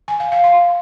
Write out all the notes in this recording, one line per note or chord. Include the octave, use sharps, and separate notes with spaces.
G#5
F5
F5
C6